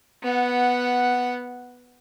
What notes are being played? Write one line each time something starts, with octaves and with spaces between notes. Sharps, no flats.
B3 F#5